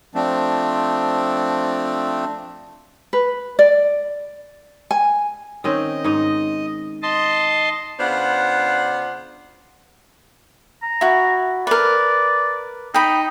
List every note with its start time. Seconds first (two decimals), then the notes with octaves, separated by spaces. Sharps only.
0.15 F3 A3 C4 D4
3.13 B4
3.59 D5
4.91 G#5
5.64 D#3 C4 C#4 D#5
6.04 G#2 D#4
7.02 D#5 A5 C6
8.00 C#3 B3 D4 F4 C5 F#5
10.82 A#5
11.01 E4 F#4
11.67 A#4 B4 D5
12.94 D#4 G5 B5